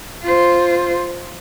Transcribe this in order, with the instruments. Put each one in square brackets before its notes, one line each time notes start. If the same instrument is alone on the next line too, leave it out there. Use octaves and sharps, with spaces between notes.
[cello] F4 C5